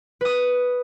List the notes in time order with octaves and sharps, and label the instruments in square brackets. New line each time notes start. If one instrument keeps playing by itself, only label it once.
[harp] B4 D#6